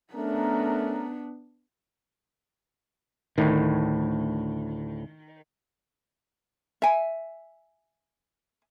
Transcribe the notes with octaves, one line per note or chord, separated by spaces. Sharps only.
A3 B3 C#4 D4 A#4
D2 A2 D#3
E5 G#5